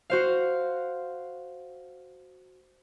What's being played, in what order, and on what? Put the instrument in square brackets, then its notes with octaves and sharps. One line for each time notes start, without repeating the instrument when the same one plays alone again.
[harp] F#4 C5 F5